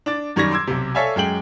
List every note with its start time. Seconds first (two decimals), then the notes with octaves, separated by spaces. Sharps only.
0.06 D4 D6 A6
0.36 F#2 D#3 G3 C#6 G#6 A#6
0.51 C6 D6 E6 G#6
0.67 B1 C3
0.95 A4 C#5 D5 E5 F5 G#5
1.16 F#2 G#3 G5 F#7